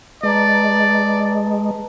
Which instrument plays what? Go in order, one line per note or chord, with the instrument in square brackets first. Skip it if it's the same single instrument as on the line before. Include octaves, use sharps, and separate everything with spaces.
[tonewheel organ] G#3 [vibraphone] B4 A5 A#5 [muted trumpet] D5